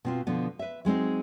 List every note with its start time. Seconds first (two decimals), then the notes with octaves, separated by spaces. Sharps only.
0.05 B2 C4 F4
0.27 B2 D3 F3 B3
0.59 B4 E5
0.85 F#3 G#3 C4 D#4